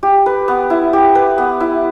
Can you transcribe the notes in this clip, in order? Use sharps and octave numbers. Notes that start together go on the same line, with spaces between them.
G4
B4
B3
E4
G4
B4
B3
E4